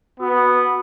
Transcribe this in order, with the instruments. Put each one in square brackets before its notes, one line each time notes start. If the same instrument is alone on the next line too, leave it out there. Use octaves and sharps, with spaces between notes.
[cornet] B3 [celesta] F#4 D#6 E6